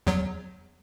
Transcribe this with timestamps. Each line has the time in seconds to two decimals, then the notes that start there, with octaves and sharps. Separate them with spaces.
0.07 E2 F#3